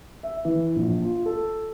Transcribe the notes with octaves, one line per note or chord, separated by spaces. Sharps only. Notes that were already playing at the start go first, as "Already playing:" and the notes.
E5
E3
A#1
F4
A4